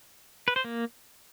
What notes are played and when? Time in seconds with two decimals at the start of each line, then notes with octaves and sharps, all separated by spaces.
0.48 B4
0.56 C5
0.64 A#3